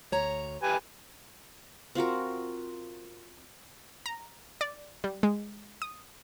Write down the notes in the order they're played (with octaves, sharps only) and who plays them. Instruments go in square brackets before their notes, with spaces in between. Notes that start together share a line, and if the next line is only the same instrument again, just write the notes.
[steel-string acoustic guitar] D2 C#5 A#5
[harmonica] G4 B4 G#5
[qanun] C4 F4 F#4 A#4
[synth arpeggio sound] A#5
D5
G3
G#3
D#6